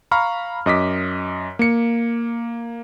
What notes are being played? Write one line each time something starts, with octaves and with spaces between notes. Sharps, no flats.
F5 A#5 B5 C#6 F6
F#2 D#5 D6 B6
A#3 C#7